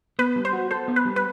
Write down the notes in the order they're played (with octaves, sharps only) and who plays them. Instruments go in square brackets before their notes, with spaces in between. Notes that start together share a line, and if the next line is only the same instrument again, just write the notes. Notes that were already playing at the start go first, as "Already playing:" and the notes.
[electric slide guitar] B3 [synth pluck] B4
[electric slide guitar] G3
[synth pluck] C5
[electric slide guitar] F#4
[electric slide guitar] A4 [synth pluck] C5
[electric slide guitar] B3
[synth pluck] B4
[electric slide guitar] G3
[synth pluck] B4